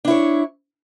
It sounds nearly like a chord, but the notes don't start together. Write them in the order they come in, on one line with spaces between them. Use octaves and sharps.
D4 E4 C#5